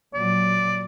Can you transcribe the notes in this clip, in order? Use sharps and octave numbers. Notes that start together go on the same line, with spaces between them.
A#2 F#3 D5